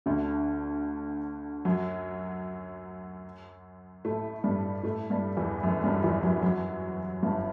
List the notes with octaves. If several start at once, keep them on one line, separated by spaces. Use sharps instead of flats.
D2 D3
F#2 F#3
A2 A3
G2 G3
A2 A3
G2 G3
E2 E3
F#2 F#3
G2 G3
E2 E3
F#2 F#3
F#2 F#3
G1 G2